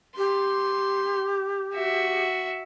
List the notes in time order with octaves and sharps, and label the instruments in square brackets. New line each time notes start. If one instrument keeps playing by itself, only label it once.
[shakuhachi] G4 [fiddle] C6
[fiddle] F#4 E5